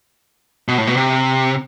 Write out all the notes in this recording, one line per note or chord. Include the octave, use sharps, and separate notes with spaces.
B2
A2
B2
C3